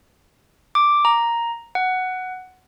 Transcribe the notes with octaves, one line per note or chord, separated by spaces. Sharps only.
D6
A#5
F#5